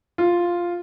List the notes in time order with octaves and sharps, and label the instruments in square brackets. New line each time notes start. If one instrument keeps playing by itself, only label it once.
[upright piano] F4